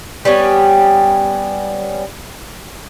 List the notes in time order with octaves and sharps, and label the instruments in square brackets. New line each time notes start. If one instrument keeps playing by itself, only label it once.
[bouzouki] G3 B3 C#4